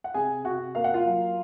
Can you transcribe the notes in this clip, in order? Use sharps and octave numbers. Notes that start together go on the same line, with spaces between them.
F#5
C3 G#4 G#5
C3 F#4 F#5
A#3 F5
F#5
F4 F5
F#3